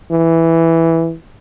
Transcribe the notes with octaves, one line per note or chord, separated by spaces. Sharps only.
E3